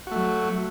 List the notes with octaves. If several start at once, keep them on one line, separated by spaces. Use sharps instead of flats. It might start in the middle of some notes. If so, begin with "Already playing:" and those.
F#3 A3 F#4